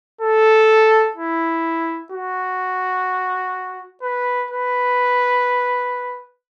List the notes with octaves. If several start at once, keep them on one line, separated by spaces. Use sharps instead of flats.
A4
E4
F#4
B4
B4